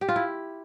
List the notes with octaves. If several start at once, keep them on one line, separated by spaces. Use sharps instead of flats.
G4
F4
E4